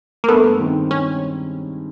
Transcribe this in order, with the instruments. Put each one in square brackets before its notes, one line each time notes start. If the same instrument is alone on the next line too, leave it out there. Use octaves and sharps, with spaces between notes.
[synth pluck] A#3
[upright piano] G2 [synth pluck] A3 B3
[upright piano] D#3 G#3 C4 D#4
[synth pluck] C#4